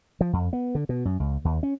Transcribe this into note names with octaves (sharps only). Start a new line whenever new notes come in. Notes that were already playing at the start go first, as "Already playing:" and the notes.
F3
F2
B3
D3
B2
F#2
C#2
D#2
C#4